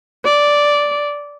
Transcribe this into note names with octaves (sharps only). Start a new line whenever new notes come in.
D5